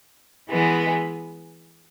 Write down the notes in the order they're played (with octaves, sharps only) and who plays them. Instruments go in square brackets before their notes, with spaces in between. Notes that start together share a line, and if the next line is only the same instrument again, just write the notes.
[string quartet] E3 G#3 B3